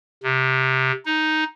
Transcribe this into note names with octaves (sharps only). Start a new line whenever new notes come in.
C3
D#4